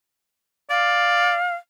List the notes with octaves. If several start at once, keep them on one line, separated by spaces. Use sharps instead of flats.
D5 F5